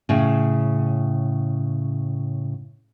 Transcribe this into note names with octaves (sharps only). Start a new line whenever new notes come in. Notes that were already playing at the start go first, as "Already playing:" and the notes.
A2 C#3